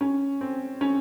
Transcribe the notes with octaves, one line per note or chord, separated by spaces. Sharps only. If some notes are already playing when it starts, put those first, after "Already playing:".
C#4
C4
C#4